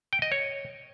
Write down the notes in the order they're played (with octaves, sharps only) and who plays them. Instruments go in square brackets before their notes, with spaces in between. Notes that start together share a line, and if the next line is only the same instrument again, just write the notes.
[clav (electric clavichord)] G5
D#5
C#5